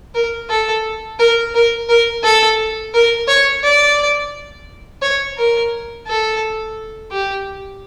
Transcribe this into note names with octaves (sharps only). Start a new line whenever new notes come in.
A#4
A4
A#4
A#4
A#4
A4
A#4
C#5
D5
C#5
A#4
A4
G4